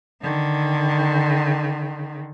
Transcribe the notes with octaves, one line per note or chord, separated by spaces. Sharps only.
D3 D#3